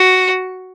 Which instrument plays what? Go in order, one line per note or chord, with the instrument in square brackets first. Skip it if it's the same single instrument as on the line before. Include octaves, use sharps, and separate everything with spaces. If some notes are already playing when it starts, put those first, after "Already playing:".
Already playing: [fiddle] F#4